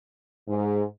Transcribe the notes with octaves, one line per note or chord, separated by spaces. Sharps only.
G#2